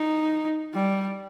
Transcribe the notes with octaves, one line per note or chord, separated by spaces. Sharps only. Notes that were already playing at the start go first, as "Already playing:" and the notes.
Already playing: D#4
G3